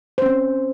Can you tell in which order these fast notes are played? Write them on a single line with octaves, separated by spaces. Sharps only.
C5 C#4 C4